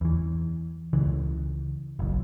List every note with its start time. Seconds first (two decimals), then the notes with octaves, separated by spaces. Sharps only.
0.01 E2 E3
0.93 C#2 C#3 E3
1.99 F#1 B1